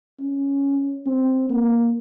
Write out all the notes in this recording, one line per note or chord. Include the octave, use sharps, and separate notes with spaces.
C#4
C4
A#3